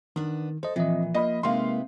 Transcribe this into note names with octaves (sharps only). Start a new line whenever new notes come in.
D#3 B3 D4
A4 C5 D#5
A#2 E3 F3 C4 D#5
A#3 F4 D#5 B5
C3 G#3 A#3 D#4 B4 F5 C6